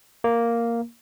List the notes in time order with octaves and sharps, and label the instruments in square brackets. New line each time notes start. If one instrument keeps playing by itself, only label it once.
[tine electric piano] A#3